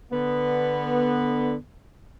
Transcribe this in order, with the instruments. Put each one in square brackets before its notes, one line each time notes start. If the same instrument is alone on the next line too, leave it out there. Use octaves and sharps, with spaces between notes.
[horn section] D3 B3